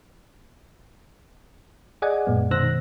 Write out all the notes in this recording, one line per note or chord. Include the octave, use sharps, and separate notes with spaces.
G#4 D5 D#5 F#5 G#5
F#2 A#2 G#3 B3
B2 D#3 C5 E6 F#6 A#6